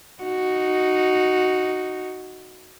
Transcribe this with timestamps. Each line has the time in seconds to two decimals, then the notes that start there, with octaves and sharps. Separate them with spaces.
0.23 D#4 F#4